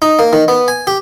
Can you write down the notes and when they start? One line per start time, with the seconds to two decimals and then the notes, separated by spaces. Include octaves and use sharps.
0.02 D#4
0.19 A#3
0.33 D#3
0.48 B3
0.68 G#5
0.87 G4